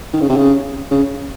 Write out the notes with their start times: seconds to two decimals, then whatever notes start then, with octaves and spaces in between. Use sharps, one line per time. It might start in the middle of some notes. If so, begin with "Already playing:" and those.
0.13 D#3
0.21 C#3
0.29 C3
0.37 C#3
0.91 C#3